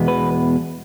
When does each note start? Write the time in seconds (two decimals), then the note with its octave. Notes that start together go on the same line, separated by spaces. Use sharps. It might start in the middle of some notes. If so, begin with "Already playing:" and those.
Already playing: E2 B2 G#3 B3
0.08 B4